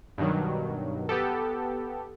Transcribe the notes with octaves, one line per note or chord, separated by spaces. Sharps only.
G2 B2 D#3 F#3
B3 G4 A4